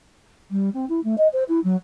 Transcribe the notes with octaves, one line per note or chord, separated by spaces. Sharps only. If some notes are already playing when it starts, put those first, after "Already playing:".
G3
C4
E4
A3
D#5
C5
E4
F#3